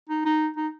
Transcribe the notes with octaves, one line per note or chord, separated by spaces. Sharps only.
D#4
D#4
D#4